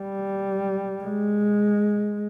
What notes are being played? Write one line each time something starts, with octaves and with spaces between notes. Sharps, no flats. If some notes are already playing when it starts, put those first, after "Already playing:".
Already playing: G3
G#3